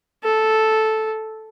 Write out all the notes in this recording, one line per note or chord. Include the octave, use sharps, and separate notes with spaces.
A4